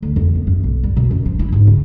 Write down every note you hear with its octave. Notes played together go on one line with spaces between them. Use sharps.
D2
F2
B3
F#2
B1
G3
B2
F#2
F3
E4
G#2
C#3